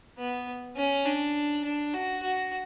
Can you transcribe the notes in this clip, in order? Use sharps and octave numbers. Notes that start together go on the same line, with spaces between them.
B3
C#4
D4
D4
F#4
F#4